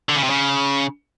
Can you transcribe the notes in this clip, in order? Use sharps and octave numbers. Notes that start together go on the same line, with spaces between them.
D3
C#3
C3
C#3